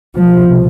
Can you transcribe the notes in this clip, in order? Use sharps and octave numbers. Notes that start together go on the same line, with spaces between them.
C2 B2 F3